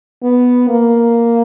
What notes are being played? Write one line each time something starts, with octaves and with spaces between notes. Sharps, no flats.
B3
A#3